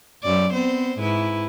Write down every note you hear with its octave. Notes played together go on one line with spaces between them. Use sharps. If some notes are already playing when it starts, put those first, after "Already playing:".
F#2 D5
B3 C4 C5
G#2 E4 B4